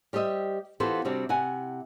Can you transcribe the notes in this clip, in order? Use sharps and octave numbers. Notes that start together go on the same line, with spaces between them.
G3 G4 C5 D#5 E5
E3 B3 F4 G4 A4 C5
C3 G3 C4 D4 F#4
C3 E4 F#5 G#5